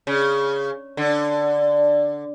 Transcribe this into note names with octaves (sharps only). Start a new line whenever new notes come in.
C#3
D3